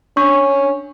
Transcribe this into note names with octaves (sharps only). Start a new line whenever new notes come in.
C#4 D4 C#6